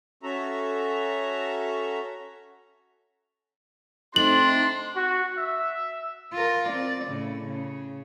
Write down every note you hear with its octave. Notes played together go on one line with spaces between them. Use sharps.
C#4 F#4 A4 E5 A#5
A3 C4 D4 D#4 C6 F#7
F#4
E5
F4 A#4
C4 D5
A2 C#3
C#3